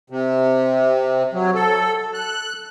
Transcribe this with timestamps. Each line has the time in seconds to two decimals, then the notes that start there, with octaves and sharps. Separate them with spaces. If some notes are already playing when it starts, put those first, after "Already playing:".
0.10 C3
1.34 F#3
1.55 A4
2.14 F#6